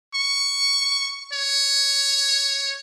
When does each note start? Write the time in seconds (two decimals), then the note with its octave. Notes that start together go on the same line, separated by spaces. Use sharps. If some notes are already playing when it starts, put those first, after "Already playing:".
0.14 C#6
1.33 C#5